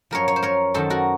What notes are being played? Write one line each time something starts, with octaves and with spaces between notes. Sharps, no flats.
F#2 F3 A#4 C#5
C#5
C5
A#4 C#5
F#2 D#3 F#3 A4 C5
F#4 A#4